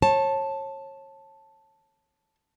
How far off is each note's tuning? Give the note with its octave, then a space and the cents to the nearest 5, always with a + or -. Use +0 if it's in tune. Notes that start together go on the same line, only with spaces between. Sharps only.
C#5 -30 A5 +0